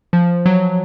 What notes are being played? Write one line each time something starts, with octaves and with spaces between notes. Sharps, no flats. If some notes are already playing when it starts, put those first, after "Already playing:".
F3
F#3